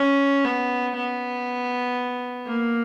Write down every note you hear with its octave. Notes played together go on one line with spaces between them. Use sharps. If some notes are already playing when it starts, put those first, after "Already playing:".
Already playing: C#4
B3
B3
A#3